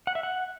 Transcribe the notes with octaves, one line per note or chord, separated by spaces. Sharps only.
F#5
E5
F#5